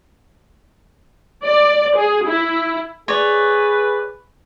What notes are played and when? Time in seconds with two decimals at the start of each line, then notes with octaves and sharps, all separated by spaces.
1.44 D5
1.96 G#4
2.27 E4
3.08 G#4 B4 C#5 D5